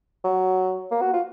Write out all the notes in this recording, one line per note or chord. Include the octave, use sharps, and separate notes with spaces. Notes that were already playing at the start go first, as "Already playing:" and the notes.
F#3
A#3
F#4
F4